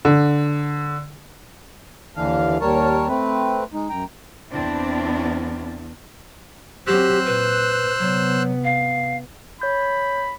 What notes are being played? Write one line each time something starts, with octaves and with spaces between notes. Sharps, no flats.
D3
D#2 D3 E3 D4 F5
D#2 G3 A#4 C#5 A5
A3 C4 B4
G#3 D#4
F#2 G5 A#5
E2 C4 D4 E4
F#3 C4 G4 C5 E6 F#6
A#2 B4
C3 F#3 B3
F5
C#5 B5 G6